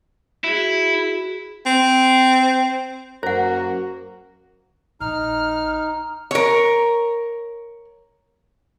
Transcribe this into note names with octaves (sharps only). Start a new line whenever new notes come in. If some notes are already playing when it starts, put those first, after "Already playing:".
E4 F#4 G#4
C4
F#2 A#3 F#4 A#4 C5 F#5
A#1 D#4 F6
A#4 C#5